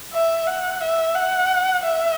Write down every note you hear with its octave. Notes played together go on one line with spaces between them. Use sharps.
E5
F#5
E5
F#5
E5